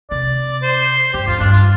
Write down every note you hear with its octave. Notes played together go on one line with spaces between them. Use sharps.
C3 D5
C5
G2 G4
F2 F4
G2 D4
F4